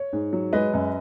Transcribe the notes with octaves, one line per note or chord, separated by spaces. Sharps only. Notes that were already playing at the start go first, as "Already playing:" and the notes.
Already playing: C#5
G#2
F#3
G#3 B4 D#5
F#2